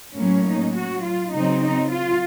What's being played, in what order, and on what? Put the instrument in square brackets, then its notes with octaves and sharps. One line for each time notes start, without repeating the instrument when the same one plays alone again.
[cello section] A2 F#3 A#3 C#4
D#4
F#3 F#4
F4
C#3 F#3 C4 D#4
D#4
F4